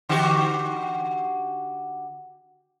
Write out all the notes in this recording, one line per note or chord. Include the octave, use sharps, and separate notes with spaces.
D3 F#4 G4